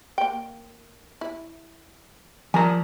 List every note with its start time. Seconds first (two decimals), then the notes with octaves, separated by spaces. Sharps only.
0.18 A#3 G5
1.21 E4
2.54 F3 A#4 G#5 A#5